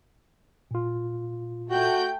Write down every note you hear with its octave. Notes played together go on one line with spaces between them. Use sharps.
A#2 F4
A3 F#4 G5 G6